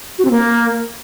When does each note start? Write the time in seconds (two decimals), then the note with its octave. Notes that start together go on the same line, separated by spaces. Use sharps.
0.19 F#4
0.25 C4
0.31 A#3